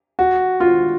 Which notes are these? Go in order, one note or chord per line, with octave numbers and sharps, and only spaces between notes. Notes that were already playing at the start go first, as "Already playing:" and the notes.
F#4
F4